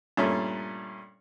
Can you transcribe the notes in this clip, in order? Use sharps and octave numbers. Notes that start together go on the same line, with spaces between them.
G2 A#2 A3 C#4